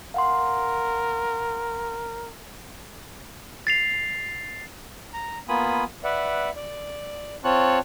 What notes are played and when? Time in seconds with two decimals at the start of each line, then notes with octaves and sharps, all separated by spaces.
0.14 A#4 F5 F#5 C6
3.67 A6 C7 F7
5.13 A#5
5.49 A#3 B3 F4 G#5 B5 D#6
6.04 B4 D5 E5 F#5
6.56 D5
7.44 C4 F4 C#5 A5 C#6 F#6